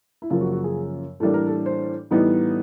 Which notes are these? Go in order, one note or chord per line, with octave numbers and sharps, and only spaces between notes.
E4
F#2 C#3 F3 A#3 F4
F#4
F#4
G#4
A2 E3 G3 A#3 D4 A4
A#4
A4
C5
A2 E3 G3 B3 D#4